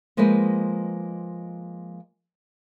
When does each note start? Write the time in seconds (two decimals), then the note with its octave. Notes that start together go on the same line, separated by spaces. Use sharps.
0.17 F3 G#3 A#3 B4 C5 D#5